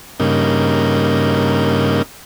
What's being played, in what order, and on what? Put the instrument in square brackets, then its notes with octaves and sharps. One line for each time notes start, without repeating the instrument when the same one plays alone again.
[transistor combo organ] G2 C#3 A#3 D#4